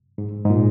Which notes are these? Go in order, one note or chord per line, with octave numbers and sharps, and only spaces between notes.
G#2
G#2
A#2